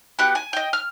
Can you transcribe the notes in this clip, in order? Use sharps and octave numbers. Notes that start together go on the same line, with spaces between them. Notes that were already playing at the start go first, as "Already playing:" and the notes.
B3 F#4 G4 F#6
G#5
D#5 G5
F6